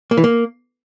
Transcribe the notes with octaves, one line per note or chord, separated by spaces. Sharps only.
A#3
E3
A#3